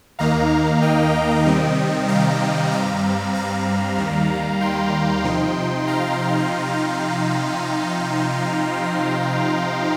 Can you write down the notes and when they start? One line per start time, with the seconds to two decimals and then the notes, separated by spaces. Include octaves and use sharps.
0.19 D#2 D#3 A#3 D#4 F5 A#5
0.82 D#5 G5
1.46 C3 D#3 G3 C4
2.08 F5 A#5
2.71 G2 G3 C4 F5 A#5
3.34 F5 A#5
3.97 D#2 D#3 G3
4.61 G5 C6
5.24 C3 F3 D#4
5.87 F5 A#5